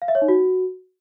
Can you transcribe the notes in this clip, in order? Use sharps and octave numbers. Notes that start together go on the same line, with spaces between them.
F5
E5
C#5
D#4
F#4